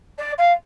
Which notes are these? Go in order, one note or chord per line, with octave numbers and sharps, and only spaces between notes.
D5
F5